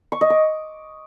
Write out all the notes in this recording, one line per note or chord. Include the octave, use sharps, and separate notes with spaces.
C#6
D#5
D6